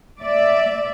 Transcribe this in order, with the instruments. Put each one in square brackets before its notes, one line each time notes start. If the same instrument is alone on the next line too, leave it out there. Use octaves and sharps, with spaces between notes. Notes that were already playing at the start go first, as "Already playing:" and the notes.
[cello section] D5 E5